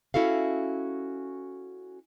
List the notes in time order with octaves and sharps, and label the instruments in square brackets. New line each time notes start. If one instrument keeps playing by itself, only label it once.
[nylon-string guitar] C#4 E4 F#4 A4 F5